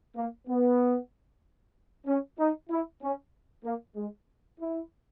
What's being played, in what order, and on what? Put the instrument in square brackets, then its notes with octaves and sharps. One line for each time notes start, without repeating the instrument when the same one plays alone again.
[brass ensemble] A#3
B3
C#4
D#4
E4
C#4
A#3
G#3
E4